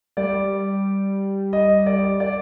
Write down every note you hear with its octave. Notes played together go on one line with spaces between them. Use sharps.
G3 D5
D#5
D5
D5